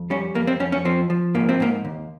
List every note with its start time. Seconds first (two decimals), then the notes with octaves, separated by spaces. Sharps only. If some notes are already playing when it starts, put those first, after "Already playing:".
Already playing: F2
0.10 G3 C#4
0.35 F2 A#3
0.47 C4
0.60 F2 C#4
0.72 C#4
0.85 F3 C4
1.10 F3
1.34 G#2 A#3
1.49 C4
1.60 G#2 A#3
1.85 D#2